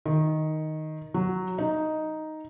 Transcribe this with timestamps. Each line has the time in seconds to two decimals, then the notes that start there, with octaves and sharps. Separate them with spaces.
0.06 D#3
1.14 F#3
1.58 D#4